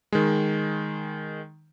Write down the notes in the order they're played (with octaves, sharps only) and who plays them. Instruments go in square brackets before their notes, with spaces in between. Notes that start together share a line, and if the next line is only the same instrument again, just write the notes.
[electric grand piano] D#3 G#3